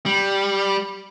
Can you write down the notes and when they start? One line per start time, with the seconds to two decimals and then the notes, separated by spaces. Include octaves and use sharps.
0.06 G3